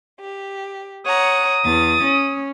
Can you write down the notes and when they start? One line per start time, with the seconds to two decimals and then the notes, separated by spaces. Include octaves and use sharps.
0.21 G4
1.05 C#5 F#5 A#5 D#6
1.64 E2 A6
2.05 C#4